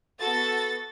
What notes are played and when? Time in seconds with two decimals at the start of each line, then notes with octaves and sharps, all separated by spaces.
0.20 B3 F#4 A4 A6